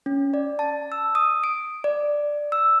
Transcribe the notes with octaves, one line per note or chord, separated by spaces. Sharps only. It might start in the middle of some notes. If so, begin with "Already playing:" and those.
C#4
D5
A5
E6
D#6
D7
D5
E6